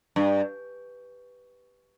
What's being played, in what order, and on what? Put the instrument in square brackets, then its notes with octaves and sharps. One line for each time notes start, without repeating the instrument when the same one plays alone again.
[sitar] G2